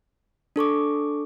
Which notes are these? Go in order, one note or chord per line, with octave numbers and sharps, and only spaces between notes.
D4 A4 C#6 D6